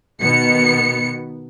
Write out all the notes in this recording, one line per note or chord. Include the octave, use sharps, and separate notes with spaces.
B2 D#3 B3 C#7